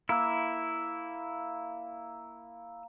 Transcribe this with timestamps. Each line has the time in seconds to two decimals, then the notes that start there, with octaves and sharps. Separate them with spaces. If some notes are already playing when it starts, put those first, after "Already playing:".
0.09 A#3 E4 E6